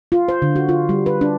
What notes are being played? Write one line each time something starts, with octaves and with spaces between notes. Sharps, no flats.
F4
C5
D3
F#4
F4
G3
B4
D4